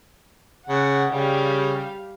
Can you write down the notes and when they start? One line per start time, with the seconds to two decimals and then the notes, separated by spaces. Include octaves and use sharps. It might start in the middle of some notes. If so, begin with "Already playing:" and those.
0.69 C#3 F#5
1.10 C#3 G3 F5